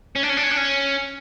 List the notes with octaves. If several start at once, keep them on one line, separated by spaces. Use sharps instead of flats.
C#4
D4
C#4
D4
C#4
D4
C#4